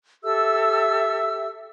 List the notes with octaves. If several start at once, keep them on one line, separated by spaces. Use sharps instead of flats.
G4 A4 E5 E6